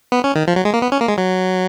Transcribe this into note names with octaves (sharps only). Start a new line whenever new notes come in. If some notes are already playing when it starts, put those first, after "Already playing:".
B3
C#4
D#3
F3
F#3
G#3
A#3
B3
C#4
A#3
G#3
F#3